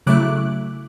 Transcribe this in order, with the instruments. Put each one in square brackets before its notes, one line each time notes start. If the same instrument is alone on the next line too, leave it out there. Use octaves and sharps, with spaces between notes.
[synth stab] C#3 F#3 A3 E4 D6 F#6